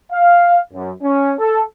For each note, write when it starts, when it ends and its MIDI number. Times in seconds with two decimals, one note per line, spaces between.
0.12 0.59 77
0.73 0.91 42
1.02 1.34 61
1.39 1.61 69